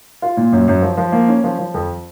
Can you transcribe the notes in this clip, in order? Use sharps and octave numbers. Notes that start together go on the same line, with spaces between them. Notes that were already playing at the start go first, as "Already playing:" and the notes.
F4
A#2
F#2
F#2
F3
F3
A#3
C#4
F3
F3
F2